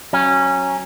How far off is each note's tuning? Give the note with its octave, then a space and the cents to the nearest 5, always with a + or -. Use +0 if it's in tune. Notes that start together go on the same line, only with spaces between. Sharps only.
F#3 +0 C#4 -15